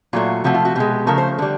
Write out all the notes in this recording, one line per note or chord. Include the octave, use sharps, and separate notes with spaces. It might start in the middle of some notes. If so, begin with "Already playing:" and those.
A#2 F#3 A3 F4
C3 F3 A3 F#4
F4
F#4
B2 G#3 G4
C#3 F3 A3 A#4
C5
D3 G3